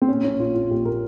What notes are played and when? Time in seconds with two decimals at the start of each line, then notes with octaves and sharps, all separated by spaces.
0.02 C4
0.09 A#2 C#4
0.24 A#1 C#4
0.39 A#1 F4
0.55 A#1 F4
0.70 A#1 G4
0.85 A#4